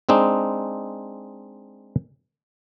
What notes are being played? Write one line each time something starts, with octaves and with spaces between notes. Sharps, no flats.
G#3 C4 D4 D#4